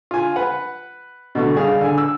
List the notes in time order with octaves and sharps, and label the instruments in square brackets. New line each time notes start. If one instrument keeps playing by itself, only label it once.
[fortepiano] F4 G#5
B4 F#5
B2 D3 A3 C#6
G2 D4 G#4 F5
D3 G#5
E6